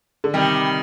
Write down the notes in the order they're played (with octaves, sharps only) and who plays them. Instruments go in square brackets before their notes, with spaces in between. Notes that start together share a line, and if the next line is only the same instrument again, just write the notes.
[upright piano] D3
[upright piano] C3 [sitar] D#3 G3